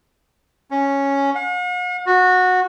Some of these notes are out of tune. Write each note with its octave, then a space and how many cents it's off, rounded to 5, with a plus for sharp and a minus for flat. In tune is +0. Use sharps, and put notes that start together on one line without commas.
C#4 +0
F#5 -45
F#4 -15